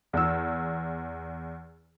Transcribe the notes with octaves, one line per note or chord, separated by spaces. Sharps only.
E2 E6